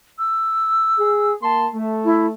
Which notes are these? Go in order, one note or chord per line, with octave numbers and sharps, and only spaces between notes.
E6
G#4
A#3 A5 C6
A3
E4